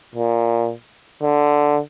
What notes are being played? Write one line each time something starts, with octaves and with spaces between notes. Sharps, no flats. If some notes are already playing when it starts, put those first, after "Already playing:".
A#2
D3